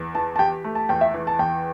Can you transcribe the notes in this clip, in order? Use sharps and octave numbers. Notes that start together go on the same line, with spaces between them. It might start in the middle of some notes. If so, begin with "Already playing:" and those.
Already playing: E2
E3 A5
A5
G4 G5
A3
A5
E2 G5
E5
E3
A5
E2 G5